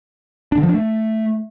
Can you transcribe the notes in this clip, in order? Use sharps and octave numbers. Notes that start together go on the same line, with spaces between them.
D4
D3
F3
D4
A3